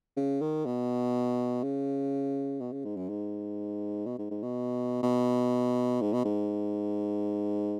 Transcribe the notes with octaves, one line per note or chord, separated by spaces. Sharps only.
C#3
D#3
B2
C#3
B2
C#3
G#2
F#2
G#2
B2
G#2
G#2
B2
B2
G#2
B2
G#2